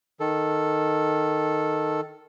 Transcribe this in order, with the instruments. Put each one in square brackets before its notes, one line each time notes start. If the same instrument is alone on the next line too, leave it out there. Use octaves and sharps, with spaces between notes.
[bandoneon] D#3 A4